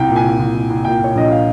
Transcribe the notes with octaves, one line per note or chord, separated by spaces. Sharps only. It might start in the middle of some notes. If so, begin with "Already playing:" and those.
Already playing: C2 G5
A#2
G#5
C2
C2
C2
C2
A#2 G5
A#2 C#5
A#1 D#5
F5